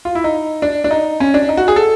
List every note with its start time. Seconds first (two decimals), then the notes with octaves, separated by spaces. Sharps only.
0.05 F4
0.15 E4
0.24 D#4
0.62 D4
0.84 D4
0.91 D#4
1.20 C#4
1.34 D4
1.49 D#4
1.57 F#4
1.68 G#4
1.76 A4